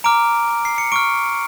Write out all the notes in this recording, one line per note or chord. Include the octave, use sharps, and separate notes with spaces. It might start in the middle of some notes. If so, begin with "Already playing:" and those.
A#5 D6 F6 D7
C7
C#7
C#6 F6 D7